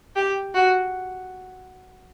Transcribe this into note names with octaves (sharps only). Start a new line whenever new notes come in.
G4
F#4